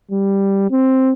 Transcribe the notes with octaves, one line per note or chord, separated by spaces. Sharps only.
G3
C4